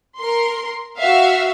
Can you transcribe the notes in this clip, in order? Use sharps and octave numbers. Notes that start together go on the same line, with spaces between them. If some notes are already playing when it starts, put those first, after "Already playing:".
A#4 C6
F#4 E5 F5